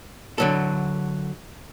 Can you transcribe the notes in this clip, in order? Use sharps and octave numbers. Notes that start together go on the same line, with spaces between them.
D3 F#3 A4